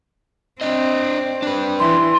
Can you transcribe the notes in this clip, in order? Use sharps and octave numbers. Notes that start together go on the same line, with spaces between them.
C4 D4 D#5
D4 B4
E3 C6